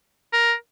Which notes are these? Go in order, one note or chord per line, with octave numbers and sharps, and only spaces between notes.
A#4